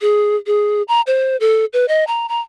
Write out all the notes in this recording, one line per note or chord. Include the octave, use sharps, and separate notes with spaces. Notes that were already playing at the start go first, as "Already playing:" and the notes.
G#4
G#4
A#5
C5
A4
B4
D#5
A#5
A#5